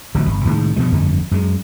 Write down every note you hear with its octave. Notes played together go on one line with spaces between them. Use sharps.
D1 A1 D3 F#3
G1
C2 A2 D#3 G#3
G2 B2 F3 G3
G1 F2 D3 A3
F#2 G#3